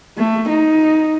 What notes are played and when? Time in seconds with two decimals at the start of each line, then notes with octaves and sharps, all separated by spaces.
0.18 A3
0.49 D#4